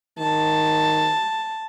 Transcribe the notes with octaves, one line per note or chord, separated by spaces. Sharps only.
D#3 A5